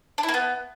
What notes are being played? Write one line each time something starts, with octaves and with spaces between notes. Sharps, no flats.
D4
E4
A#3
B3